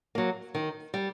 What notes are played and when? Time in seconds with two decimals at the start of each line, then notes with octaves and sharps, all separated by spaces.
0.15 F#3 A#3
0.55 D#3
0.94 G3